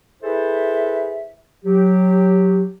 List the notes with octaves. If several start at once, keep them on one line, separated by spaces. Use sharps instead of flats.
E4 G#4 A4 B4 C5 E5
F#3 G4